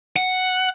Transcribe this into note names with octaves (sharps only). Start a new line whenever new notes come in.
F#5